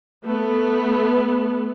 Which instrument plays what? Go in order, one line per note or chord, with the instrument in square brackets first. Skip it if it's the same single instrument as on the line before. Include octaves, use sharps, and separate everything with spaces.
[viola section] A3 B3